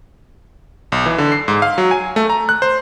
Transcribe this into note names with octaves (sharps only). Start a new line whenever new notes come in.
B1
E3
D3
C7
G#2
F5
F#3
G#5
A3
A#5
F#6
C5